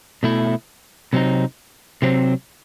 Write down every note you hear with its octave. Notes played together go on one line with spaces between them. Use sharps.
B2 A3 E4
C3 F#3 C4 D#4
C3 F#3 C4